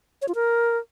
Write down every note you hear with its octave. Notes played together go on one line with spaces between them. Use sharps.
C#5
F4
A#4